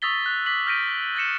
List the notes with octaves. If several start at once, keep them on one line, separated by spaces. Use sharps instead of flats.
C#6 D#6 E6 A6 B6 G7
F#6
D6 B6 F#7
F6 G6 A#6 B6 D7 D#7
G6 A6 A#6 C#7 E7